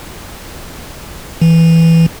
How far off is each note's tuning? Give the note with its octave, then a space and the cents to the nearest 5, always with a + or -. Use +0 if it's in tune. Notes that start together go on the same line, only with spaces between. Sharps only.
E3 +0